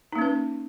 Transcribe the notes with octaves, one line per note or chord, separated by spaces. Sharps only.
A#3 C#4 D#4 B4